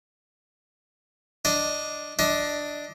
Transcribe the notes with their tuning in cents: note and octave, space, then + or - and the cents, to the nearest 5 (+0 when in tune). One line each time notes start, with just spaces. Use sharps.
D4 +0 D#5 +0
D4 +5 D#5 +25